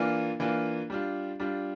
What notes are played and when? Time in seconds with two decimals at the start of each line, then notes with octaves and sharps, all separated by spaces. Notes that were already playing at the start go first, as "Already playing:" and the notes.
Already playing: E3 A#3 D4 F4
0.40 E3 A#3 D4 F4
0.90 G3 D4 F4
1.40 G3 D4 F4